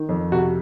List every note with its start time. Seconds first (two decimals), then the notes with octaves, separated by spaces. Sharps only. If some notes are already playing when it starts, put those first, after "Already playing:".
Already playing: D#3
0.09 F2
0.32 C3 F#4